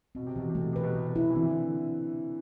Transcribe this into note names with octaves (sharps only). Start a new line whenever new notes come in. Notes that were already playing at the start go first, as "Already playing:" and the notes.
B2 C4
C3
B2 E3
C3
A3
B2
C3 B4
B2
C3 A3
B2
E4
E3
D3 C4
E3
D3